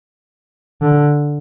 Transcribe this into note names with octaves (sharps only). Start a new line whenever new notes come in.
D3